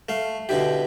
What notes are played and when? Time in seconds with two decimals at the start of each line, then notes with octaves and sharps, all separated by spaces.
0.09 A3 F5
0.49 B2 D3 E4 G4